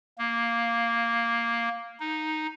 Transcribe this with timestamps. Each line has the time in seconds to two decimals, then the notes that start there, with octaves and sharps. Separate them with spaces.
0.18 A#3
2.00 D#4